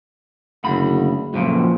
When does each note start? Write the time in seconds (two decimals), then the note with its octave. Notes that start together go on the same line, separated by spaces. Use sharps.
0.64 F#1 D2 B5
1.34 F#2 A#2 C#3 F3